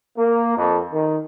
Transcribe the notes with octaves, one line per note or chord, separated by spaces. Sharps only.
A#3
F2
D#3